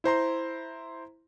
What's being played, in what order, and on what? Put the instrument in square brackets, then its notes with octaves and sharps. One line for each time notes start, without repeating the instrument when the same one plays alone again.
[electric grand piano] E4 C5 A#5 C6